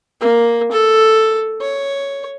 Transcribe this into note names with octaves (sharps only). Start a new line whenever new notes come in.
A#3
A4
C#5